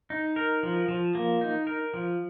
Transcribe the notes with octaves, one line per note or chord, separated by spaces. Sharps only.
D#4
A#4
F3
F3
A#3
D#4
A#4
F3